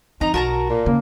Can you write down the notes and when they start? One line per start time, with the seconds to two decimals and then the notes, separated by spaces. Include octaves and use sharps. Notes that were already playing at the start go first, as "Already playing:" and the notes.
0.21 F3 C4 D#4 A#5
0.34 B1 F#4 A#4 A5 A#5
0.70 A#2
0.86 C#3 A#3